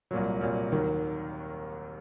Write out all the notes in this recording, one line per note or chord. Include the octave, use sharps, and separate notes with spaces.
C2 A#2 F#3
C2 A#2 F#3
D#2 D#3 F#3